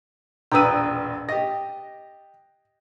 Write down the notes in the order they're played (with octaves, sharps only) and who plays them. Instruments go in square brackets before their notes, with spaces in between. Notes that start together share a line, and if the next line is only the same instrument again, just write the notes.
[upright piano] E1 A#1 D#7 [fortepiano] B4 G5 [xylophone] A#5 D#6 E6
[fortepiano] G4 D#5 [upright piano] A#6